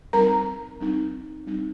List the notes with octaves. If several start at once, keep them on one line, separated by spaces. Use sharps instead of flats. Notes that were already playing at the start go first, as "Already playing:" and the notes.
G3 C4 D#4 A#4 A#5
G3 C4 D#4
G3 C4 D#4